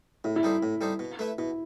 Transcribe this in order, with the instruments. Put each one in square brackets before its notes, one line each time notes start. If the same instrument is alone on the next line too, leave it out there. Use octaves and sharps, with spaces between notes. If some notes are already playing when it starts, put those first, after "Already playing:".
[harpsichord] A2 [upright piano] E4
[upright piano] E4
[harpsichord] G3 D#4 A4 C5
A2
G3 D#4 A4 C5
B2
A3 E4 B4 E5
[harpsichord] B2 [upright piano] E4